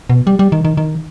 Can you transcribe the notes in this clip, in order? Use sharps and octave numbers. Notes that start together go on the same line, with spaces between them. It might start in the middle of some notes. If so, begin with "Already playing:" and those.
B2
G3
G3
D#3
D#3
D#3